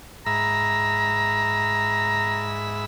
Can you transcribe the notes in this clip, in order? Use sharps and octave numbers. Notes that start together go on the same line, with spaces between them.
G#2 E5 A#5 B5